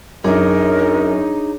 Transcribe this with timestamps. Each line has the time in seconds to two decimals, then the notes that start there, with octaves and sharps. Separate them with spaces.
0.24 F#2 D4 D#4 G#4 A#4 C#5